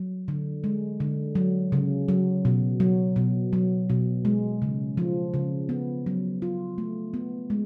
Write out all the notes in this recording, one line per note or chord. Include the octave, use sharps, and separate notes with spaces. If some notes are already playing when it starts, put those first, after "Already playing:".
Already playing: F#3
D3
G#3
D3
F#3
C#3
F#3
B2
F#3
B2
F#3
B2
G#3
C#3
F3
C#3
B3
F#3
F4
A3
B3
G#3